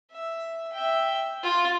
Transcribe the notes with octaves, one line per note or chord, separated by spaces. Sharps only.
E5
E5 G5
F4